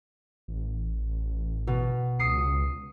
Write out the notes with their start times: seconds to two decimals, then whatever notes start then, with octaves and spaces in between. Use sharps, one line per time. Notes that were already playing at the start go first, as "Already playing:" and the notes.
0.48 A1
1.67 B2
2.19 C#2 D#6 C7 C#7